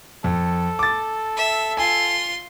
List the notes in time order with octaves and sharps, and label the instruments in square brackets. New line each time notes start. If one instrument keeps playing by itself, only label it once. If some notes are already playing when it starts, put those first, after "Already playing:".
[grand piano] F2 [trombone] A4
[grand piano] D6 A6
[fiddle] E5
[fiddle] F4 C6 [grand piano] G#5